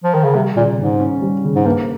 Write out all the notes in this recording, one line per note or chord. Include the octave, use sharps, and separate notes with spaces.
F3
D#3
C#3
C3 G3
A#2 C#3
G#2 C#3
C#4
G3
C#3
G#2
G2 A#3